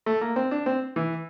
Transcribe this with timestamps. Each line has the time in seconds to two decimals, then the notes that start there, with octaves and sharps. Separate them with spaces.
0.06 A3
0.21 A#3
0.36 C4
0.51 D4
0.66 C4
0.96 E3